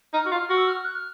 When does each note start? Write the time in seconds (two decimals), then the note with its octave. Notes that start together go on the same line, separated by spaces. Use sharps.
0.14 D#4 F6
0.26 F#4
0.32 F4 F6
0.50 F#4
0.57 E6
0.68 F6
0.85 F#6
0.95 F6